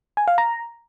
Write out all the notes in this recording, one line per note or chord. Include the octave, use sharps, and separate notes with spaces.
G#5
F5
A#5